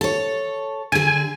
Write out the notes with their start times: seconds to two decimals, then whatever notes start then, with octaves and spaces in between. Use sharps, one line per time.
0.01 A4 C#5
0.92 D3 G#4 G#5